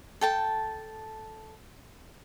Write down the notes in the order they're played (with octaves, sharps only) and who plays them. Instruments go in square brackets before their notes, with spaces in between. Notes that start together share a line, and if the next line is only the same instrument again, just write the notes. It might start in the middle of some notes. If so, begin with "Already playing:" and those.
[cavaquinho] A4 G5 A5